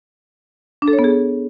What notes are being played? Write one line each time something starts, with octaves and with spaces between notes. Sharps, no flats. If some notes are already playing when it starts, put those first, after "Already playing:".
D4
A4
C#5
B3
G#4